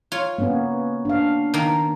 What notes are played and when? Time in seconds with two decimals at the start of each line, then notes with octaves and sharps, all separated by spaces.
0.12 F4 C#5
0.39 A#3 B3 C#4
1.05 D4 F5
1.54 D#3 A#3